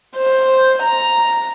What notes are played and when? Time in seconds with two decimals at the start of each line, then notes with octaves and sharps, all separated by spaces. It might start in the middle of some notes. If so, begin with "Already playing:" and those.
0.18 C5
0.83 A#5